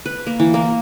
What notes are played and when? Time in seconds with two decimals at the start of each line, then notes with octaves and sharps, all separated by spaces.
0.06 B4
0.26 A#3
0.40 E3
0.54 A#3